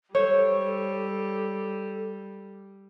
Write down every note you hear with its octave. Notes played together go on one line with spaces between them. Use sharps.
G3 A4 C5 C#5